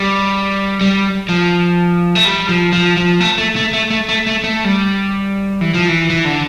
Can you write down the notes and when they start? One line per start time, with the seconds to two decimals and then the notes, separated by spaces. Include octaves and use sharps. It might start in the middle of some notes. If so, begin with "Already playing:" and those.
Already playing: G3
0.81 G3
1.29 F3
2.15 A3
2.25 G3
2.49 F3
2.73 F3
2.97 F3
3.20 A3
3.38 A3
3.56 A3
3.73 A3
3.90 A3
4.09 A3
4.26 A3
4.44 A3
4.64 G3
5.61 E3
5.74 F3
5.88 E3
6.10 E3
6.25 D3